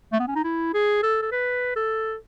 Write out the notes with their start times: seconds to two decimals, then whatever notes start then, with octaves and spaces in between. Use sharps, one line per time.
0.12 A3
0.20 B3
0.28 C#4
0.35 D#4
0.44 E4
0.74 G#4
1.03 A4
1.22 A4
1.32 B4
1.76 A4